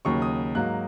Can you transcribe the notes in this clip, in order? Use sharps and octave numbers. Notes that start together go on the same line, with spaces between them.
D#2 C#3 F#3 C#6
D#6
G#2 F#3 A#3 F#6